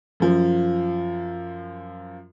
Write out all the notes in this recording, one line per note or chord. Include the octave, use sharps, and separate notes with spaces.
F#2 F3